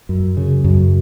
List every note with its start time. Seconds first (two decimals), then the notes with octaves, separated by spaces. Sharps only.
0.09 F#2
0.37 C#3
0.64 F#2